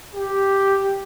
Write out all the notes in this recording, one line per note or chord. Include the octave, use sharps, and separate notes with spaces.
G4